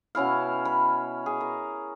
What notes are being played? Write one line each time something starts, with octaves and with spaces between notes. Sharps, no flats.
B2 C#4 E4 F5
B5
G#4
A#4